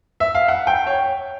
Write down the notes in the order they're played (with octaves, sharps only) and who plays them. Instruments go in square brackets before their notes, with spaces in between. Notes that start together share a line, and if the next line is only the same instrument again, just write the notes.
[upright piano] E5
F5
F#5
G5
C#5